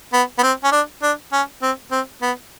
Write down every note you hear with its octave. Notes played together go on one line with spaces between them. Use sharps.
B3
B3
C4
C#4
D4
D4
C#4
C4
C4
B3